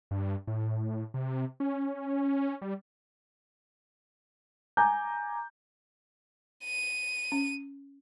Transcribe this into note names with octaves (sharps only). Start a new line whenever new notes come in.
G2
A2
C3
C#4
G3
G#5 A#5 D6 G6
D#7
C#4